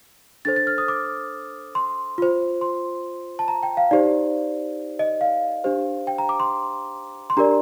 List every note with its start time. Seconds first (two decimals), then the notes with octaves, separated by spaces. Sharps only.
0.45 D4 A4 C5 A6
0.56 A6
0.67 F6
0.78 D#6
0.88 D6
1.75 C6
2.18 F4 C5
2.61 C6
3.39 A5
3.48 A#5
3.63 G5
3.77 F5
3.91 D#4 G4 C5 D5
4.99 D#5
5.21 F5
5.64 D4 G4 C5
6.07 G5
6.18 A#5
6.29 D6
6.40 C6
7.30 C6
7.37 D4 G4 A#4 D5 A#5